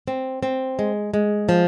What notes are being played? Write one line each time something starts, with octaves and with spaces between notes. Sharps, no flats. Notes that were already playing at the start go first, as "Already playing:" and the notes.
C4
C4
G#3
G#3
F3